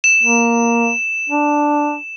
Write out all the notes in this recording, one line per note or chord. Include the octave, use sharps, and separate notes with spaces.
E7
A#3
D4